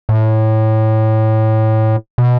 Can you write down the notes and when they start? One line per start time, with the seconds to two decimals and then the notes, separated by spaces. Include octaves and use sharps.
0.09 A2
2.18 B2